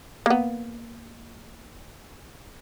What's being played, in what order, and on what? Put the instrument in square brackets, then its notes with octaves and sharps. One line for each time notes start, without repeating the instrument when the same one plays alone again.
[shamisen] A#3 B3